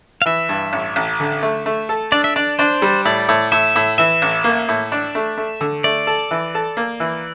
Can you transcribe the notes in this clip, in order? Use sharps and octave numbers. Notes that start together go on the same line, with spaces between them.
F5
E3 E5
G2
A1
A1
D3
A3
A3
A4
D4 D5
E5
D4 D5
D4 C5
G3
A2 D5
A2
A2 E5
A2
E3 E5
A1
A#3
A2
D4
A3
A3
D3
A3 D5
A4
E3
A4
A#3
E3